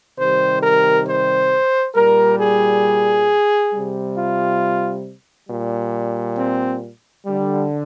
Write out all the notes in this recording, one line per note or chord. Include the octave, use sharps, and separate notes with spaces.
C3 D#3 G3 C5
A#4
C5
A#2 G3 A#4
G#4
C3 G3
F4
A#2 G3
C4
D3 G3